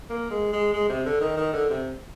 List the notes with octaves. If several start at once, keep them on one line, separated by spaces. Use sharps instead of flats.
A#3
G#3
G#3
G#3
C3
D3
D#3
D#3
D3
C3